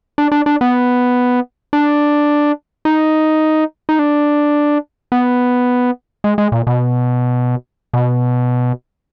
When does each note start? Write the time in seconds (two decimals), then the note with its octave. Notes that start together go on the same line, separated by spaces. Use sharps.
0.18 D4
0.32 D4
0.46 D4
0.61 B3
1.73 D4
2.85 D#4
3.89 D#4
3.99 D4
5.12 B3
6.24 G#3
6.38 G#3
6.52 A#2
6.67 B2
7.93 B2